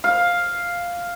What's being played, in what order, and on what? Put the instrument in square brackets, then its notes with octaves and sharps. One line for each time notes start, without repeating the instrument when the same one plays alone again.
[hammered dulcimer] F5